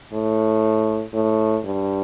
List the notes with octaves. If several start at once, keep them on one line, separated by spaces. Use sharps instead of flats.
A2
A2
G2